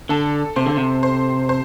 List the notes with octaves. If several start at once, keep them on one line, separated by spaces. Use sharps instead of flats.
D3 A4
C3 C5
D3
C3
C5
C5